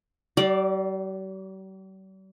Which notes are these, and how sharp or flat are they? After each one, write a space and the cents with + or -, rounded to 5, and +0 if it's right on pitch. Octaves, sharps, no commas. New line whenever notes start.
G3 -45 D5 +0